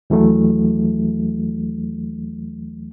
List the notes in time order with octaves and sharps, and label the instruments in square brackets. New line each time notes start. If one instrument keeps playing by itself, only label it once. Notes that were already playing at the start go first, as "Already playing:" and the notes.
[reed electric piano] D#2 E3 F#3 A3